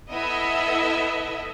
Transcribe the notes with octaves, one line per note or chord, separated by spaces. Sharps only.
B3 E4 A4 D#5 E5